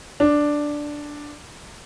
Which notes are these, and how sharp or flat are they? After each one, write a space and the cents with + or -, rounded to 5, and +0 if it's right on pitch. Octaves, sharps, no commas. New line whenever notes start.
D4 +0